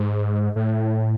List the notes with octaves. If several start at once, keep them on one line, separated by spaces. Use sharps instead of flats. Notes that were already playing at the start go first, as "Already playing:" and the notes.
Already playing: G#2
A2